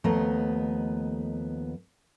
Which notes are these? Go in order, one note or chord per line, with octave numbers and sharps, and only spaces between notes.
D#2 F3 A3 B3 D#5 A#5